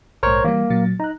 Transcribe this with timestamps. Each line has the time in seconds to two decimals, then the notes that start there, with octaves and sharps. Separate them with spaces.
0.23 A#1 G#2 A#4 C5 C#5
0.45 E3 G3 A#3
0.70 A#2 F#3 A6
1.00 D#4 A#5 F#6